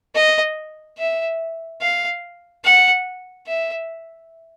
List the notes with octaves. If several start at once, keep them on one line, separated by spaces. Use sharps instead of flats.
D#5
E5
F5
F#5
E5